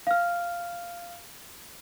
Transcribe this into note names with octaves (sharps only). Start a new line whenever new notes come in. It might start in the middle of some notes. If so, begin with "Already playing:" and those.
F5 F6